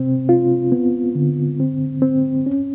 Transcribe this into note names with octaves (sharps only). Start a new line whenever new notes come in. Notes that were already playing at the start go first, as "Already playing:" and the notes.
Already playing: C3 C4
F4
B3
D3
C4
C4
C#4